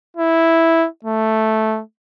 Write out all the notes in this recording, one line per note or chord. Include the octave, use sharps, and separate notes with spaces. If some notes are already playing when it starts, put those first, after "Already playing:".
E4
A3